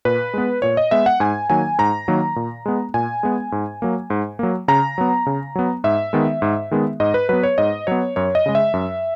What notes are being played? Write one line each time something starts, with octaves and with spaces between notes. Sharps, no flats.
A#2 B4
G#3 B3
A#2 C#5
D#5
G#3 B3 E5
F#5
G#2 G#5
D#3 F#3 A#3 G#5
G#2 A#5
D#3 F#3 A#3
A#2
G#3 B3
A#2 G#5
G#3 B3
G#2
F#3 A#3
G#2
F#3 A#3
C#3 A#5
F#3 B3
C#3
F#3 B3
G#2 E5
D#3 G#3 B3
G#2
D#3 G#3 B3
G#2 D#5
B4
F#3 B3 B4
C#5
G#2 D#5
F#3 B3 C#5
F#2 C#5
D#5
C#3 G#3
E5
F#2